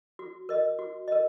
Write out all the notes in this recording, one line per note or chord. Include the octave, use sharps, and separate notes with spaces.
F#4
A#4 D#5
F#4
A#4 D#5